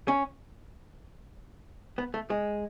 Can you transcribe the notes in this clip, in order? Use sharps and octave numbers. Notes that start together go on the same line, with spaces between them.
C#4
B3
A3
G#3